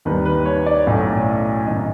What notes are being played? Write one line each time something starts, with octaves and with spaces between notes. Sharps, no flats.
D#2 D#3 G3 C4 B4
B4
C#5
D5
B1 A2 F#3 A3 C#4
G#1 F#2 D#3 D#5